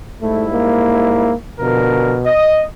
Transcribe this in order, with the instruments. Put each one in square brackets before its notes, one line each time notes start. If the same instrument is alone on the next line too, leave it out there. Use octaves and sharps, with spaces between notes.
[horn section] G#2 G3 E4 [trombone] A3
[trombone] A#3
[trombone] B2 [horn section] D3 F3 A#4
[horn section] D#5